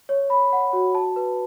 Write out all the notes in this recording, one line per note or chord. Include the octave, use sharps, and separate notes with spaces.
C#5
B5
F#5
F#4
A5
B4